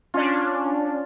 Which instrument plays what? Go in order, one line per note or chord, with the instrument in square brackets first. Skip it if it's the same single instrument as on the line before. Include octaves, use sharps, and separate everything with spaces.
[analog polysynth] C#4 D4 [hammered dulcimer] F4